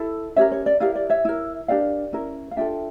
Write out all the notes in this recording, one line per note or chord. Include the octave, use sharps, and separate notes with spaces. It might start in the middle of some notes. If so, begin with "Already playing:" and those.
Already playing: E4 A4
C#4 G4 A#4 C#5 E5
C#5
D5
E4 G4 A#4 D5 F5
D5
C#5 E5
E4 A#4
D4 G4 A#4 D5 F5
C#4 E4 A#4
F5
D4 F4 A4 E5 G5